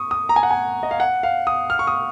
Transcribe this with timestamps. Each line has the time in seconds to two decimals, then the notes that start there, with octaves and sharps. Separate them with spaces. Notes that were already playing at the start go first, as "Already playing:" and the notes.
Already playing: C#6 D#6
0.11 D#6
0.29 A#5
0.36 G#5
0.43 F#5
0.51 G#5
0.83 D#5
0.91 F5
1.00 F#5
1.23 F5
1.47 D#6
1.70 F6
1.79 C#6
1.87 D#6